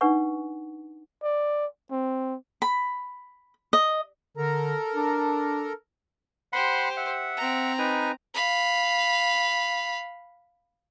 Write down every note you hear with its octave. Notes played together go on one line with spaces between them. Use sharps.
D4 D#4 B4 F#5 G#5 C#6
D5
C4
B5
D#5
D3 A4 A#4 A#5
D4
G4 C5 F#5 B5 C6
E5 F#5
C4 A#5
D#4 B4 G#5
F5 B5